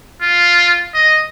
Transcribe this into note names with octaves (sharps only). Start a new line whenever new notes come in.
F4
D#5